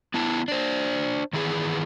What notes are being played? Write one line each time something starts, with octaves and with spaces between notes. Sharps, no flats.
B3 E4 A5
D4 C5
D#3 E3 B3 G#4